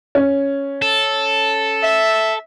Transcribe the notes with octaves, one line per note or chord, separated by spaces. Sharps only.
C#4
A4
E5